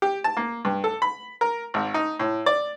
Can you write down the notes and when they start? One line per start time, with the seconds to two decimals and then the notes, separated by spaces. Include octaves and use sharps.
0.02 G4
0.24 A5
0.37 A#3
0.65 G2
0.84 A4
1.02 B5
1.41 A#4
1.74 G#1
1.94 D#4
2.20 A2
2.46 D5